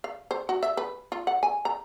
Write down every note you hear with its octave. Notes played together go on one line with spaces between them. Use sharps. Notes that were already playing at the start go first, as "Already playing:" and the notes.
F5
C5
F#4
E5
B4
F4
F#5
G#5
A#5